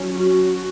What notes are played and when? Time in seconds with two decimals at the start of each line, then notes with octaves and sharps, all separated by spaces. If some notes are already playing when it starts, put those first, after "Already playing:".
Already playing: F#3 C#4
0.13 F#4